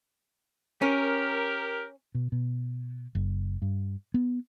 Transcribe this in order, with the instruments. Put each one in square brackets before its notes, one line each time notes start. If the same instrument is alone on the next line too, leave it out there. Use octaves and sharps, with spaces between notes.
[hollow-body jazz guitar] C#4 [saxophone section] G4 A#4
[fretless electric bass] B2
B2
F#1
G2
B3